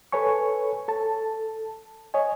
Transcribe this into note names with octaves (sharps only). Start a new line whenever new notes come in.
A4 B4 C#5 G#5 C#6
A4 A5
C#5 D#5 G#5